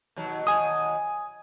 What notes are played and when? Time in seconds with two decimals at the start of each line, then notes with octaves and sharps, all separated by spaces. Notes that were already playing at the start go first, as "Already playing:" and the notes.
0.16 D#2 B2 F#3
0.47 G#5 D#6